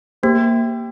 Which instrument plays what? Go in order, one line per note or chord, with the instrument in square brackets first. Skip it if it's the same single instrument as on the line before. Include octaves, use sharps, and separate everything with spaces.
[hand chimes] A#3 [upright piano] G4 C5